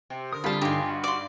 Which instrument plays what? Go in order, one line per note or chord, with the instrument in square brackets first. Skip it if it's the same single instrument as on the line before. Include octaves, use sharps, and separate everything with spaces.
[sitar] C3
[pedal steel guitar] D3 D#6 [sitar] A#4
[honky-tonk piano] C2 G3 [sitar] F4 [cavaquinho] A5 B5
[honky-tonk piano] G2 D#4 [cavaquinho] G4 G#5
[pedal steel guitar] F#4
[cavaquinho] D5 C6